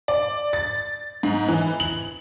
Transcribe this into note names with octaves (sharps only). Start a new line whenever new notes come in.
D5
A6
G#2
E3
F#7